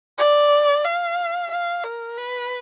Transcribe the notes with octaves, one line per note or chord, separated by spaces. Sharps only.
D5
F5
F5
A#4
B4